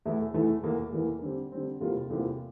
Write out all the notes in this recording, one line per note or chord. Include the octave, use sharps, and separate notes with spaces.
E2 E3 A3 E4
E2 E3 A3 E4
E2 E3 A#3
E2 E3 A#3
D3 G3 C4
D3 G3 C4
E2 C3 G3 A#3 F4
E2 C3 G3 A#3 F4